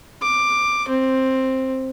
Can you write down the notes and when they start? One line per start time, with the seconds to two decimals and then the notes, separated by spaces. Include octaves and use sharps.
0.22 D6
0.88 C4